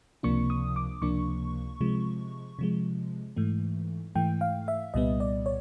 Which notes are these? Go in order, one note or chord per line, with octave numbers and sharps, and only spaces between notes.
C#2 C3 F3 A#3 D4 C#6
D#6
D6
C#2 C3 F3 A#3 D4 C#6
C3 F3 G#3
C3 F3 G#3
G#2 E3 A3
G#2 E3 A3 G5
F5
E5
C2 A#2 G3 B3 D#5
D5
C#5